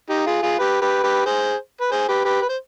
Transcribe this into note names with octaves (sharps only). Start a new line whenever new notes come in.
D#4 G4
F4 G#4
F4 G#4
G4 B4
G4 B4
G4 B4
G#4 C5
B4
G#4 C5
G4 B4
G4 B4
B4
C5